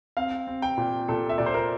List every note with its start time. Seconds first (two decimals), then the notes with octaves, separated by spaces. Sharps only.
0.17 C4 F5
0.47 C4
0.62 G5
0.77 A#2
1.08 A#2 A4
1.29 E5
1.38 A#2 D5
1.46 C5
1.54 A#4